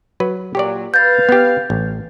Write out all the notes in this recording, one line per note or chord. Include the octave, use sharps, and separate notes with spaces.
F#3 B4
A#2 F#3 G4 C#5 D5
B4 F5 G6 A6
B3 G4
A1